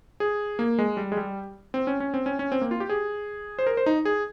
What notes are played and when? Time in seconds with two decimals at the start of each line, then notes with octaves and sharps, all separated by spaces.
0.20 G#4
0.59 A#3
0.79 G#3
0.97 G3
1.12 G#3
1.17 G3
1.74 C4
1.87 C#4
2.00 C#4
2.14 C4
2.26 C#4
2.39 C#4
2.52 C4
2.61 A#3
2.71 F4
2.80 G4
2.89 G#4
3.59 C5
3.67 A#4
3.77 C5
3.86 D#4
4.05 G#4